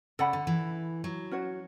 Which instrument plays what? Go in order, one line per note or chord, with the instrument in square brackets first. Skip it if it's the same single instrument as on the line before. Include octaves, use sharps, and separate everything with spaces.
[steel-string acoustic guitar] C#3 [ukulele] A4 D5 F#5 B5
[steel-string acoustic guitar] D3
E3
F#3
[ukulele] C#4 F#4 C#5